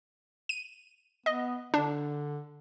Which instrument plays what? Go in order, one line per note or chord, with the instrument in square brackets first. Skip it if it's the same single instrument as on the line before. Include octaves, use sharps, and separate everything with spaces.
[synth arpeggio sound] D#7
[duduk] B3 [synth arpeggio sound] D#5
[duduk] D3 [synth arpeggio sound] D4